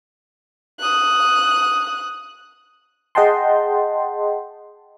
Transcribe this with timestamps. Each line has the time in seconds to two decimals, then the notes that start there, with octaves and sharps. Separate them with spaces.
0.80 D#6 F#6
3.15 G#4 D#5 F#5 G5 A5 C6